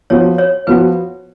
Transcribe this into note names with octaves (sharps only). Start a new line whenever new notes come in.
F3 B3 F#4 C#5
C#5
F3 B3 F#4 B4